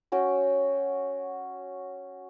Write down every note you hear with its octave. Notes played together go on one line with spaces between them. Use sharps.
C#4 F#4 G5